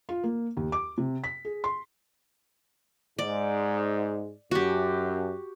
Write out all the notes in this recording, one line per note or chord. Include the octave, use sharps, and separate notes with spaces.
F4
A#3
D#2
D6
C3
B6
G#4
C6
G#2 G#3 D5
F#2 F#4 G4